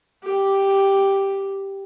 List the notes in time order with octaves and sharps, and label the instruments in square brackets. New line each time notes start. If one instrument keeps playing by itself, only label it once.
[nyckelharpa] G4